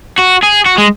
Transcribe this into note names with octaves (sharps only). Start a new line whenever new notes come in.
F#4
G#4
F#4
G#3